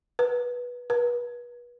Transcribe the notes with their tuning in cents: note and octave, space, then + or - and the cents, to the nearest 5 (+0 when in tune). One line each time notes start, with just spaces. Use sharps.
B4 -15
B4 -35